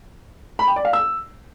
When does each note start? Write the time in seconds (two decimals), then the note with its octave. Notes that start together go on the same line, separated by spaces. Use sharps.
0.59 B5
0.68 G5
0.76 D5
0.85 F5
0.93 E6